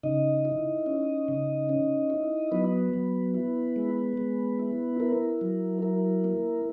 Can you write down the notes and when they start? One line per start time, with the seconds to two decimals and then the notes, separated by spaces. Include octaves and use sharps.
0.03 C#3 D#4 D#5
0.45 E4
0.86 C#4
1.28 C#3
1.69 C#4
2.10 E4
2.52 F#3 B3 B4
2.93 F#3
3.34 E4
3.76 G#3
4.17 G#3
4.59 E4
5.00 E4 A#4
5.41 F#3
5.82 E4 A#4
6.24 A#3